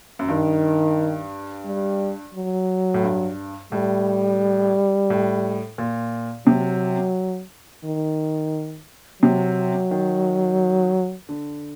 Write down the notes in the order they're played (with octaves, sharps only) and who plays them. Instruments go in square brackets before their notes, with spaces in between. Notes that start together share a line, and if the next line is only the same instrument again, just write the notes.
[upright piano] F#2
[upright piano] G2 [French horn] D#3
[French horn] G3
F#3
[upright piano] A2
G2
[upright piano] A2 [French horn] G3
[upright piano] A2
A#2
[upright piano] C3 [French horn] F#3
[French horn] D#3
[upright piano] C3 [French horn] F#3
[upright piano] D#3
D3